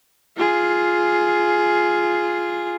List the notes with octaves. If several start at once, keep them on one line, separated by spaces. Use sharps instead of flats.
F4 G#4